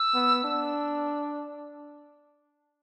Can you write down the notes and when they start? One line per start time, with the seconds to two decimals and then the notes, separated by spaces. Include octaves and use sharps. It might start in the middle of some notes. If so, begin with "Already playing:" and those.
Already playing: E6
0.14 B3
0.44 D4